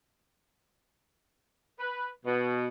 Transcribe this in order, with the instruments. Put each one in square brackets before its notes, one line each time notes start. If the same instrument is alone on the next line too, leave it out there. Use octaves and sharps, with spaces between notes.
[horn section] B4
B2